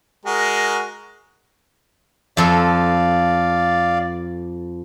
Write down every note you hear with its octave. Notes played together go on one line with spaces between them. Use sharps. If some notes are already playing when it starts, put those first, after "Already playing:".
G#3 F#4 A#4
F2 F3 A4 D5 F5